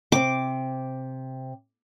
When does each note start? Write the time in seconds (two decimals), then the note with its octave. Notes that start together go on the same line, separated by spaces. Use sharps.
0.12 C3 C4 D6